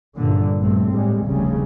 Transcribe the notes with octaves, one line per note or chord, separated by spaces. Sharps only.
G2 A#2 D3
A#1 G2 A3 C4
A2 G3 G#3
F1 D2 C#3 G3